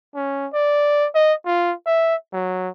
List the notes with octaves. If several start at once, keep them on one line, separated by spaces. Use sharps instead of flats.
C#4
D5
D#5
F4
E5
F#3